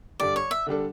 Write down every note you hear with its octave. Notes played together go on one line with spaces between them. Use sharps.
G2 D3 G3 D5
C#5
E5
D3 G3 D4 A4